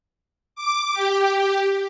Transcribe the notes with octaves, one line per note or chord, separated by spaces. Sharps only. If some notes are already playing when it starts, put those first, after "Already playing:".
D6
G4